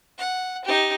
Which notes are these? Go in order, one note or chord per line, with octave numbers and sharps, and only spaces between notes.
F#5
D#4 G4